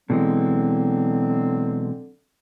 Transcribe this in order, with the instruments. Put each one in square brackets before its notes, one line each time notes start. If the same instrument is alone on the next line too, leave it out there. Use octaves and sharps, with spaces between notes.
[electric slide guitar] B2 E3 G#3 [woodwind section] D3 F#3 C4